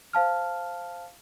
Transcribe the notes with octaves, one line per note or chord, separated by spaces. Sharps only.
C5 F5 A5 F6